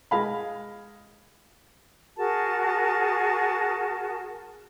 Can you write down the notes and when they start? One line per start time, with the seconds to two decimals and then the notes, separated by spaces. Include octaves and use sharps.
0.11 G#3 F5 B5
2.17 F#4 G#4 A#4 A5